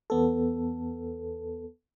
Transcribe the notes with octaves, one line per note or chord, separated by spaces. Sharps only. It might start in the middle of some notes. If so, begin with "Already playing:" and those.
E2 B3 A4